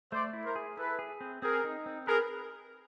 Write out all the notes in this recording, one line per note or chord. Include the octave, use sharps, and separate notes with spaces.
A3 C5 D5
E4
A#4 C5
G#4
E4 A4 B4
G#4
C4
C4 G#4 A#4
D#4
C4
G#4 A#4 B4